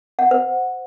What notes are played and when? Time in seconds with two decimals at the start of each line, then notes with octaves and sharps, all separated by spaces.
0.19 F#5
0.31 C5